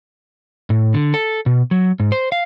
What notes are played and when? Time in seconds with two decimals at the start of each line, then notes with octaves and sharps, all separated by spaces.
0.70 A2
0.94 D3
1.14 A4
1.46 B2
1.71 F#3
2.00 G#2
2.12 C5
2.32 F5